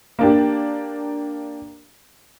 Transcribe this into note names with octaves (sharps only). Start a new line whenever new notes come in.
A#3 D4 G4